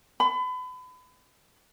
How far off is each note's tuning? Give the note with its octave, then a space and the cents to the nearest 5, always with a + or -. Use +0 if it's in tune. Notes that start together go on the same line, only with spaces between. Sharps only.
B5 +35